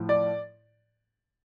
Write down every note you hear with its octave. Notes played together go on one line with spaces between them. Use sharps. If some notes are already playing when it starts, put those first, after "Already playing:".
Already playing: A2 F3
D5